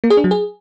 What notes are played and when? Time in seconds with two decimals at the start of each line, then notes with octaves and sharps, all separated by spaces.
0.04 A#3
0.10 G#4
0.17 D4
0.24 F#3
0.31 G#4